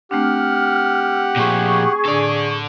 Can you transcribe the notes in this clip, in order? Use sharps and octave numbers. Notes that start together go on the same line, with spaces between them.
A3 C4 D4 G4 F#5 F6
A#2 F3 G#4 C#6
A2 D3 D4 A4 D5